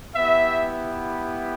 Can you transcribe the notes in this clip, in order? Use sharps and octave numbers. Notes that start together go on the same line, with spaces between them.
B3 E4 G4 E5